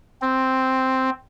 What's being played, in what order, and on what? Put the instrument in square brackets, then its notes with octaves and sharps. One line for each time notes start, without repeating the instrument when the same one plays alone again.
[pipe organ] C4